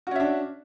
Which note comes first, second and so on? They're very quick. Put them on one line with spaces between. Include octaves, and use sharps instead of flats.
F#4 C#4 E5 D4